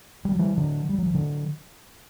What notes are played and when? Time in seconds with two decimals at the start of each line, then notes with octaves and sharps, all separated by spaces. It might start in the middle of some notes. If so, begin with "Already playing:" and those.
0.25 G3
0.32 F#3
0.39 E3 G3
0.58 D3 F#3
0.89 G3
0.98 F#3
1.06 E3
1.14 D3 F#3